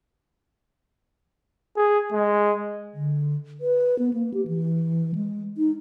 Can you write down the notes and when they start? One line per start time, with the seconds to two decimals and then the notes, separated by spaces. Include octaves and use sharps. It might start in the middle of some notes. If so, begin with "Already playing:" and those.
1.76 G#4
2.12 G#3
2.94 D3
3.61 B4
3.99 B3
4.14 A#3
4.34 G4
4.47 E3
5.15 G#3
5.58 D#4